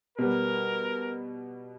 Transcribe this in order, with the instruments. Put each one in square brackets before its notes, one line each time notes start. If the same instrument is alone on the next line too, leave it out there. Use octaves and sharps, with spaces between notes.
[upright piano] B2 G3 B3 [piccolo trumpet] A#4